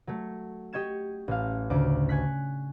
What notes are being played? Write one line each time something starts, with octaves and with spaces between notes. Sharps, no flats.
F#3 A3
G4 D#5 C#6 G#6 E7
A1 F5
D2 C#3 D6
G#5 C#6 F#6 B6